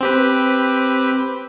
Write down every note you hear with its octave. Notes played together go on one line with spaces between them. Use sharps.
C4 G4 B4